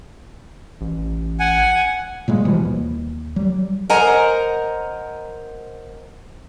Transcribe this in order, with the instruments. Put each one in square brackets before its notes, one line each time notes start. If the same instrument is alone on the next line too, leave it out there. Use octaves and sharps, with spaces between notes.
[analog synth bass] A1
[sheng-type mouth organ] F#5 G#5
[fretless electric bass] A#2 G3 G#3
B2 E3 F3 G3
D#2
F#3 G3
[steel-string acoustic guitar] A#4 C5 D#5 F#5 G#5 A#5